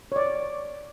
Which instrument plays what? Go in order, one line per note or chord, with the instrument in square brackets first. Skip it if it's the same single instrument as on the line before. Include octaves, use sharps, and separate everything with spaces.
[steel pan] C#5 D5